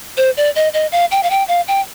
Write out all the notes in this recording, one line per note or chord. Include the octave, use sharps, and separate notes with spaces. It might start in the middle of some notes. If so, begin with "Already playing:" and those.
C5
D5
D#5
D#5
F5
G5
F5
G5
F5
G5